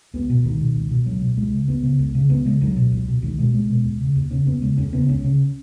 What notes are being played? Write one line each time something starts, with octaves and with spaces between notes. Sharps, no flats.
C#2 B3
B2
C#2 D#3
B2
C#2
B2
C#2 F#3
B2
C#2 G#3
C#3
C#2 B3
C#3
C#2
C#3
C#2 B3
C#3 G#3
C#2 F#3
B2
C#2
B2
C#2 D#3
B2 G#3
C#2 G#3
B2
D#2
C#3
D#2
C#3 C#4
D#2 B3
C#3 G#3
D#2 C#4
C#3 B3
C#2 C#4
C#3